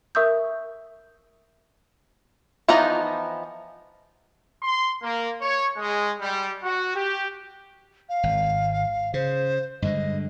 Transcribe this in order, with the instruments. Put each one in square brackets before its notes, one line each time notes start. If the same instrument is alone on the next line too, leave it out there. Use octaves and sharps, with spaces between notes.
[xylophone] A#4 E5 C#6 D#6 E6 G6
[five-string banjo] E3 F3 B3 D#4 A#5
[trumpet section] C6
A#3
C#5
G#3
G3
F#4
G4
[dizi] F5
[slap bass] G#1
[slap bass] C#3 [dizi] C5
[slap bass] G2 D3 G#3 [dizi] D#5